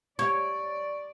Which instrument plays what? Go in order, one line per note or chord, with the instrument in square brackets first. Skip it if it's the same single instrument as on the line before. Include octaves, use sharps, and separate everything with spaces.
[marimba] G4 [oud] C#5 [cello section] D5 [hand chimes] C#6